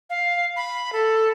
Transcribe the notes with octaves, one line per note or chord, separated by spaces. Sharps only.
F5
B5
A4